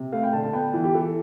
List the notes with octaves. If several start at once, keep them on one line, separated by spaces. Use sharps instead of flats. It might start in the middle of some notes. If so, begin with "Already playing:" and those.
Already playing: C3
A3 F5
G5
D3 A5
A5
B3 G5
E3
G4
E3 A4